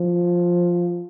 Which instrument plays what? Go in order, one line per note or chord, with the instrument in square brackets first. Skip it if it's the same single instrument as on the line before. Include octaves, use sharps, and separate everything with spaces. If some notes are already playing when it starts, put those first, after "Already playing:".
Already playing: [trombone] F3